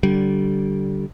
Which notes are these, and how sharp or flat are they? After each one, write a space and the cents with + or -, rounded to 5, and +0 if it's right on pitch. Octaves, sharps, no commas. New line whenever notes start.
D3 -20 G3 -30